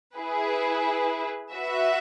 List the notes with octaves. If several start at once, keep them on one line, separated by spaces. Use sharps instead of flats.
E4 G#4 B4
F#4 B4 E5